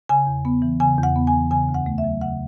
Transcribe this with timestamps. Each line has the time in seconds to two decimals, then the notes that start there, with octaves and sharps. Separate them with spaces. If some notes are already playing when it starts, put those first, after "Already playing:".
0.09 C#3 G#5
0.27 E2
0.45 B3
0.62 E3
0.80 C#3 G#5
0.98 E2
1.03 F#5
1.16 B3
1.27 G#5
1.33 E3
1.51 C#3 G#5
1.69 D2
1.74 F#5
1.86 A3
1.98 E5
2.04 F#3
2.21 C#3 F#5